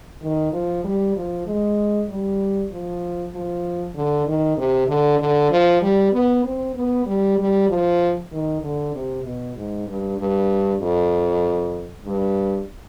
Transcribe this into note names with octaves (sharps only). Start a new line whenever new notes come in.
D#3
F3
G3
F3
G#3
G3
F3
F3
D3
D#3
C3
D3
D3
F3
G3
B3
C4
B3
G3
G3
F3
D#3
D3
C3
B2
G#2
G2
G2
F2
G2